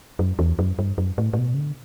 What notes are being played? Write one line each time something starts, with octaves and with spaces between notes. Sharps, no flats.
F#2
E2
F#2
G2
F#2
A2
A2
B2
C#3
D3